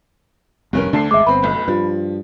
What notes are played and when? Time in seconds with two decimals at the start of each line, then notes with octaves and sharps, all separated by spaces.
0.73 F1 C2 G2 C#4 A#4
0.93 D2 D3 D4 A5 C7
1.11 G#1 G#3 E5 D6
1.27 G1 B3 C4 B5
1.42 F1 B1
1.68 G2 F3